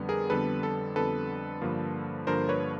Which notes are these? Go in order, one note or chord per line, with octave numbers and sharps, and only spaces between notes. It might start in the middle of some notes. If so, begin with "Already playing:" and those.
Already playing: F2 D3 G3 B3
G#4 A#4
F2 D3 G3 B3 A4 B4
A4
F2 D3 G3 B3 A4 B4
G2 D3 F3 A#3
G2 D3 F3 A#3 A#4 C5
B4 C#5